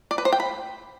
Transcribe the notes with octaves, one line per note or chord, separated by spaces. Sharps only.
D5
B4
C5
G5
B5